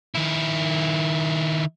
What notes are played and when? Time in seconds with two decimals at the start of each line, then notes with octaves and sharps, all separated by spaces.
0.15 D#3 E4